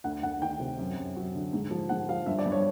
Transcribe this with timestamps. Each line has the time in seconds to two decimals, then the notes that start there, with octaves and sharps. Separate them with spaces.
0.04 D2 F#5
0.23 D2 F#5
0.42 D#3 G5
0.60 C3
0.79 F#2
0.98 F#2
1.16 F#3
1.35 D3
1.53 G#2
1.71 F3
1.89 G#2 F#5
2.09 F3 F5
2.26 G2 E5
2.39 D5
2.46 G2
2.52 C#5